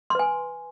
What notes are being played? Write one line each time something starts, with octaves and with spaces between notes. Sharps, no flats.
B4 G#5 C6